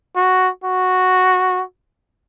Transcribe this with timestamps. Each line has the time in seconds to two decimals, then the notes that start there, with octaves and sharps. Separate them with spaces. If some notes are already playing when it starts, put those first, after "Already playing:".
0.16 F#4
0.64 F#4